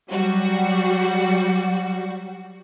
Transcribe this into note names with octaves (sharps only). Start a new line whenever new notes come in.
F#3 G3 F#4